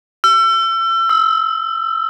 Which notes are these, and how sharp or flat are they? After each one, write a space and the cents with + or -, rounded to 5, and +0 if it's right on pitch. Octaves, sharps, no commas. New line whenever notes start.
E6 +35
E6 -25